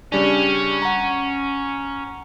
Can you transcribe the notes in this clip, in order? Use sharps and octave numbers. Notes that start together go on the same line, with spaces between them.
C#3 G3 C#4 D4
F#5 A#5